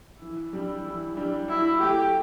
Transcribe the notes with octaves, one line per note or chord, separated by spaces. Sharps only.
E3 E4
G3 D4 G4
E3
G3 D4 G4
F#3 E4
A3 E4 G4